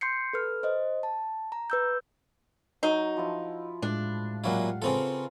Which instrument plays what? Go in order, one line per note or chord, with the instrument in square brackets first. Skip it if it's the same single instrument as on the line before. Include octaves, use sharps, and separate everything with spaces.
[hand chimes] C6 G6 C7 C#7
A4 B4 F6
C5 D#5
A5
A#5
B4 E6 G6
[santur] F#3 [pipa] D#4
[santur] F3 E4 A5
[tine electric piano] A2 G#3 [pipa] D4
[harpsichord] A#2 F#3 E4 [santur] G4 F5 F#5
[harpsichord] C#3 C4 A4 [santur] F4 B4 A#5